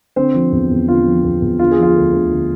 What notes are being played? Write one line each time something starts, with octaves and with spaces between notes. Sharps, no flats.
D3 C4 C5
F3
E2
E2
D3 F4
F3
E2
E2
D3 F4
G#4
F3 F4
D2
D2
D3